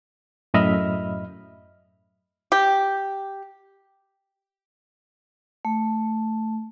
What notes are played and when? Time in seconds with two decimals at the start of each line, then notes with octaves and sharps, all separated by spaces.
0.54 F#2 A2 D#5 E5 B5 F6
2.52 G4
5.65 A3